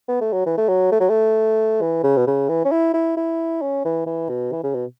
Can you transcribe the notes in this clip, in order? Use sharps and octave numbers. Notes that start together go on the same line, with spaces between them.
B3
A3
F#3
E3
A3
F#3
A3
F#3
A3
E3
C#3
B2
C#3
E3
C#4
E4
E4
E4
C#4
E3
E3
B2
E3
C#3
B2